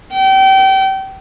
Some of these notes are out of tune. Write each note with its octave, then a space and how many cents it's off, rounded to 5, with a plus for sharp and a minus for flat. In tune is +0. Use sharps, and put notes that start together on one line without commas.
G5 -30